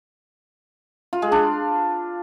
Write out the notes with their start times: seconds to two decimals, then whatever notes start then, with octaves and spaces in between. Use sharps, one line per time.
1.13 F4
1.22 G#3
1.32 D4